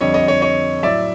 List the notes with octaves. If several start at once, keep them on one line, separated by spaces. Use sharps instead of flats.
F2 D3 G3 C#5 D#5
C#5 D#5
C#5 D#5
C#5 D#5
A2 F#3 D5 E5